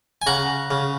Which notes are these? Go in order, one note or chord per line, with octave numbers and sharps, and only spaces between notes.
G#5
C#3 F#5 A#5
C#3